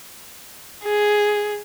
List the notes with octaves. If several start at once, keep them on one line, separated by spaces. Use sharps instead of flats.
G#4